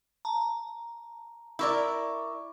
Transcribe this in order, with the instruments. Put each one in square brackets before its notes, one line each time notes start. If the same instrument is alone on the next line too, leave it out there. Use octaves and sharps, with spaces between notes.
[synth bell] A5 A#5
[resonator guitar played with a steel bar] E4 A#4 D5 [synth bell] B5 C#6 D6